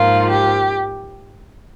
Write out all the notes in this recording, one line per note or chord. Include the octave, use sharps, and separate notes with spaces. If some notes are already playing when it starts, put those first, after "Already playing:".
Already playing: G#2 F3 A#3 F4
G4